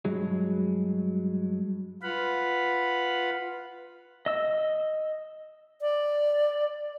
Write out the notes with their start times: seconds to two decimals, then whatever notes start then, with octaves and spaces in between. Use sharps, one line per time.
0.05 G2 F#3 G#3
2.03 F4 B4 F5 F#5 B5
4.26 D#5 E6
5.81 D5